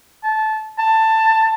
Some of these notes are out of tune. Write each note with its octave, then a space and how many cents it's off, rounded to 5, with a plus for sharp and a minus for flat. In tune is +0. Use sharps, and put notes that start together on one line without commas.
A5 -15
A5 +15